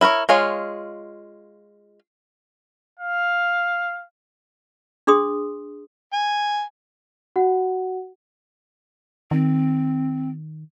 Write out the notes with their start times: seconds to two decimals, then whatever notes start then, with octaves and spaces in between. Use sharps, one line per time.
0.01 E4 A#4 B4 C#5
0.29 G#3 F4 C#5 F5
2.99 F5
5.07 D4 G#4 C6 D#6
6.13 G#5
7.36 F#4 F#5
9.31 D#3 C4